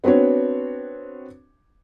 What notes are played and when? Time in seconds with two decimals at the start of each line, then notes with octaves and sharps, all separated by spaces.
0.04 B3 C4 D4 F#4 C#5